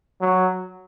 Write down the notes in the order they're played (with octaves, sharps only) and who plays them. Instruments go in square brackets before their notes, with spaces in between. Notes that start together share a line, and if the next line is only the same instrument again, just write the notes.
[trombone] F#3